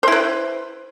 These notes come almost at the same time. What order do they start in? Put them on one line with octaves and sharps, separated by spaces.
C5 E4 B4